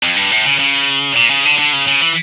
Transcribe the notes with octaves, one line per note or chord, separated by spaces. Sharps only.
F2
G2
A2
C#3
C#3
A#2
C#3
D3
D3
C#3
C#3
E3